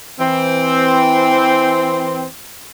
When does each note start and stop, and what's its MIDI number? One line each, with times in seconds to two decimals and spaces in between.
0.19 2.26 52
0.19 2.26 60